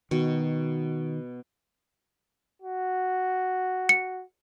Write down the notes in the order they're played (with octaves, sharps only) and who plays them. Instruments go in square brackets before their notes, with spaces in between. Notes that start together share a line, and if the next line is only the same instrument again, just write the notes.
[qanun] B2 [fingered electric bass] D#3
[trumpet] F#4
[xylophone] C#7